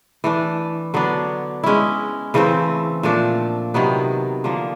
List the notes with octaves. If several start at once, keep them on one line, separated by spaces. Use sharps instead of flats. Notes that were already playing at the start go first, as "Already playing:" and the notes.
E3 A3 D4
D3 F#3 B3 D4
G#3 C#4 E4
C#3 E3 A3 C4
A#2 F3 A3 D4
C3 D#3 F#3 B3
D3 F3 A#3